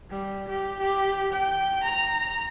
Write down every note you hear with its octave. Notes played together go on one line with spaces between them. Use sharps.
G3
G4
G4
G5
A#5